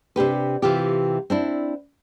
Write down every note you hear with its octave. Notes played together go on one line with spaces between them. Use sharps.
C3 D4 G4 B4
C3 E3 F4 G4
C4 D4 E4